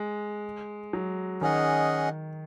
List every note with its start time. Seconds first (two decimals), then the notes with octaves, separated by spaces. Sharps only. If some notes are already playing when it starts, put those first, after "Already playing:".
Already playing: G#3
0.93 F#3
1.41 D#3 C#4 G#4 D#5 F#5